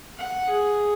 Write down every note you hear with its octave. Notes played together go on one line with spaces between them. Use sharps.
F#5
G#4